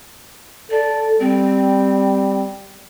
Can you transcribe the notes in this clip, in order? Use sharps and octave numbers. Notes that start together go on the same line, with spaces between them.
A4 D5
G3 C4